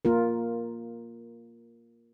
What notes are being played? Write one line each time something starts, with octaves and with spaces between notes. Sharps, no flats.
A#3 F4 A#4